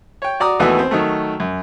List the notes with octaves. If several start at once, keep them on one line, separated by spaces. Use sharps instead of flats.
C#5 G5
F#4 D5 A#5 D#6
D#2 E3 A3 B3 F#4
C4
D#3 F#3 A3
F#2